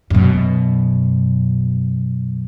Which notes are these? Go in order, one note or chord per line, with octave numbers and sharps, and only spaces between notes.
F#2 B2